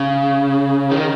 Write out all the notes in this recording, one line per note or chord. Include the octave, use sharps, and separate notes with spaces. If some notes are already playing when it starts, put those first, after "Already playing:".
Already playing: C#3
D#3